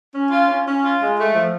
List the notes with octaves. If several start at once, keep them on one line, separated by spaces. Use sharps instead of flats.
C#4
F4
C#4
C#4
F4
G#3
A3
F3